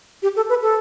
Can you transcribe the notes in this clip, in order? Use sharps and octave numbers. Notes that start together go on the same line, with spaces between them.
G4
A4
B4
A4